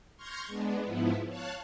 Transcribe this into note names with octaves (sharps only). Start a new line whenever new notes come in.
C6 C#6 F6 G6 G#6 A#6
G#3 B3 D4
G#2 F3 B3 E4
C#5 F5 A5 F#6